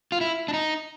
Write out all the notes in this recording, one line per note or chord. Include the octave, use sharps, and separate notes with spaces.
F4
E4
D4
D#4